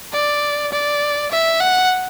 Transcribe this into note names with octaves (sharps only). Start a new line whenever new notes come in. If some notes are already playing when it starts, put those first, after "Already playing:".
D5
D5
E5
F#5